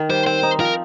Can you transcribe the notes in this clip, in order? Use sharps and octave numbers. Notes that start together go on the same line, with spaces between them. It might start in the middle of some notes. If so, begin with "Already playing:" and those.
Already playing: D#3
G3 C5
C4 C5
D#4
F3 A#4